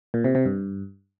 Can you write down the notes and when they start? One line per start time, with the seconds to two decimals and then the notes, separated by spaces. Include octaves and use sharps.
0.14 A#2
0.24 C3
0.35 C3
0.45 G2